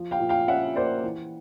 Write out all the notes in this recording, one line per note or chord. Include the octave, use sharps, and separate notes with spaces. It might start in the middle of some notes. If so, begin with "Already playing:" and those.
Already playing: F3
F5 G5
A#2
F5 G5
C#4 E5 F#5
A#3 C5 D5
E3